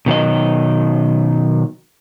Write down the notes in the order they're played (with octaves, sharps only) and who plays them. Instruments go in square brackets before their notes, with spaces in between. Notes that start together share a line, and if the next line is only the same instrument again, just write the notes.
[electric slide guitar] B2 D#3 F#3 D#5